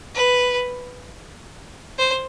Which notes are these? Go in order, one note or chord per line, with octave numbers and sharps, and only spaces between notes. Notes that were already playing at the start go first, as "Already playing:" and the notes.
B4
C5